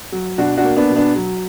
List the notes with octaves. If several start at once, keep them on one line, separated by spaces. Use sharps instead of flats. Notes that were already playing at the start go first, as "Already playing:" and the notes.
F#3
B2 D4 F#4
D4 F#4
A#3
B3 D4
B2
B3 D4
F#3